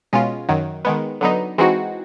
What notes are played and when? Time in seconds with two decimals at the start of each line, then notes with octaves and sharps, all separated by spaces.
0.13 B2 G#3 C#4 F4
0.49 F#2 D#3 F#3
0.85 D#3 G#3 B3
1.21 D3 F#3 B3 D#4
1.58 E3 G#3 C4 D#4 F#4